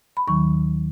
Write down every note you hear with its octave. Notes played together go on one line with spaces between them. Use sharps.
B5
D#2 D#3 F#3 C#6